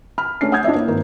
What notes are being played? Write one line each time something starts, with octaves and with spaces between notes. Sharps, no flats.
B5 F6
A3 C#4 D4 C7
F#5 D#6 G6 G#6
D4 E4 C#5 D#5 E5
A#3
G#1 A#4